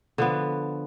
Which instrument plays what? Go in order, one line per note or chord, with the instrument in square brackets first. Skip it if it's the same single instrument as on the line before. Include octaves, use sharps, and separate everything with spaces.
[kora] D3 F3 B3